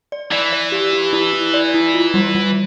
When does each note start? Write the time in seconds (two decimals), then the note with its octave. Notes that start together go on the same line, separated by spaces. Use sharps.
0.12 D5
0.32 E3 D5
0.53 D5
0.72 G4
0.93 G4
1.13 E4
1.33 E4
1.54 D5
1.74 E4
1.94 F4
2.14 G3
2.35 G3